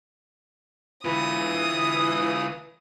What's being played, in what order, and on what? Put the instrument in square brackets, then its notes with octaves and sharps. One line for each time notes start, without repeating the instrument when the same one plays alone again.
[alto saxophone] E3 [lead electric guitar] F4 B4 [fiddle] D#6